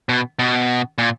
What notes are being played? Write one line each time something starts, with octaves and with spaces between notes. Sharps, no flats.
B2
B2
A#2